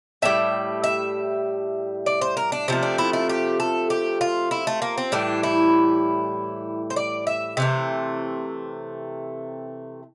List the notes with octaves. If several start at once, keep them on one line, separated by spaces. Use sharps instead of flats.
A2 G3 E5
E5
D5
C5
A#4
D4
C3 F3 A3 C4
D4
E4
E4
G4
A4
G4
F4
E4
A3
A#3
C4
A2 E3 G3 D4
E4
C5
D5
E5
C3 E3 A3